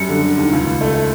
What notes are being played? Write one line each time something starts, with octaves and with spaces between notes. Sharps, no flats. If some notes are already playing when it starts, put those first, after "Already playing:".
Already playing: F#2 G3 C#7
D3
D3
D#2
C#2
C#2
A3
A3